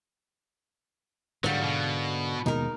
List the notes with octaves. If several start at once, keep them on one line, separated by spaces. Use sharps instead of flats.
G#2 D3 F#3 G3 F5 F#5
B2
D#2 B2 G#3 D#4 A#4